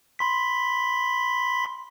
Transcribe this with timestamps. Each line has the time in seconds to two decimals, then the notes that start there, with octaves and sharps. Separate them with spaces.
0.19 B5 C6 B6